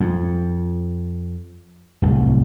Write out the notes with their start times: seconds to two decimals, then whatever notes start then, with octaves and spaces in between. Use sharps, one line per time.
0.01 F2
2.02 D1 C2